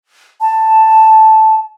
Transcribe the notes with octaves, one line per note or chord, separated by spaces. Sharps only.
A5